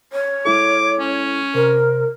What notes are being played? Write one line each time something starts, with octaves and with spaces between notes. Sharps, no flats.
C#5
G#3 E4 A4 D6
C#4
C3 A#4 C5